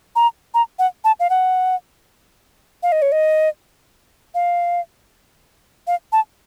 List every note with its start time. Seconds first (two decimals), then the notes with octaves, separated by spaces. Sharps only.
0.16 A#5
0.54 A#5
0.79 F#5
1.04 A5
1.20 F5
1.30 F#5
2.83 F5
2.92 D#5
3.02 C#5
3.12 D#5
4.35 F5
5.87 F5
6.12 A5